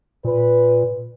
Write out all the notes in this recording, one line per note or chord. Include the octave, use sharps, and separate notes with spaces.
A#2 B4